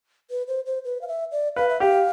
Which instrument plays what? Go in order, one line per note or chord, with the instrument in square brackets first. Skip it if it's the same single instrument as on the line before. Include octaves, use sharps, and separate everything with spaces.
[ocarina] B4
C5
C5
B4
F5
E5
D5
[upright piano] B4 [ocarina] F5
[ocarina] E5
[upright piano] G4 [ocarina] F5